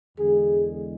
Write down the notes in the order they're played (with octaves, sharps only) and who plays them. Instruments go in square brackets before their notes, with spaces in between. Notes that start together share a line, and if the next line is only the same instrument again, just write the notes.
[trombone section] E2 D3 G#3 G#4